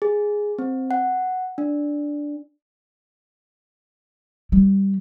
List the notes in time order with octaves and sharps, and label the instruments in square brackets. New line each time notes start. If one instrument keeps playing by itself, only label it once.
[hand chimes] G#4
C4
F#5
D4
[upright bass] G3